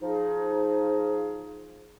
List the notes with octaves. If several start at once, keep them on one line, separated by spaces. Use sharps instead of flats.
F3 D#4 G#4